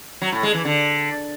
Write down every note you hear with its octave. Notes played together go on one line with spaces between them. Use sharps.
F#3
A2
G#3
E3
D3